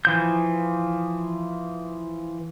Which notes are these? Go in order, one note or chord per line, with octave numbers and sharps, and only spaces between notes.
E3 F3 G6